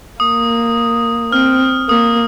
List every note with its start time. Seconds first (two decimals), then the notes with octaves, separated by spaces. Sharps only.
0.20 A#3 D#6
1.32 C4 F6
1.89 A#3 D#6